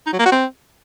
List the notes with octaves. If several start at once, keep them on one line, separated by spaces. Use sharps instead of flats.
D#4
F#3
A#3
F#4
C4